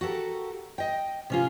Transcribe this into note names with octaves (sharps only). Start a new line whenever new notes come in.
F#4 G4 A4 A#4
D#5 G5
C3 C#4 F4